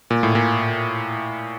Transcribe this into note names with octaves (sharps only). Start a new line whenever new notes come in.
A#2
A2
A#2